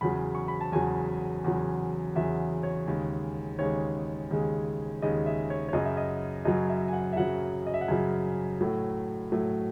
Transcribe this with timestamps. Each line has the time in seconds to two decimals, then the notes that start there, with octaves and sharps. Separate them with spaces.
0.01 E2 C#3 F#3 B5
0.35 C#6
0.48 B5
0.61 A5
0.72 E2 C#3 F#3 G#5
1.44 E2 C#3 F#3
2.15 E2 C#3 F#3 E5
2.63 C#5
2.87 D#2 C#3 G#3
3.59 D#2 C#3 G#3 C#5
4.31 D#2 C#3 G#3
5.02 D#2 C#3 G#3 D#5
5.26 E5
5.50 C#5
5.69 C#5
5.73 F#2 C#3 F#3 D#5
5.85 E5
5.97 D#5
6.45 F#2 C#3 F#3 D#5
6.69 E5
6.88 G#5
6.93 F#5
7.13 E5
7.16 F#2 C#3 F#3 F#5
7.67 D#5
7.74 E5
7.81 F#5
7.88 F#2 C#3 F#3 G#5
8.61 A2 F#3 A3
9.32 A2 F#3 A3